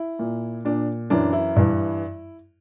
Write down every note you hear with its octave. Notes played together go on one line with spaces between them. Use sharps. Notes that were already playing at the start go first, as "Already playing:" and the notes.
Already playing: E4
A#2
A#2 D4
F#2 E3 D4
E4
G2 E3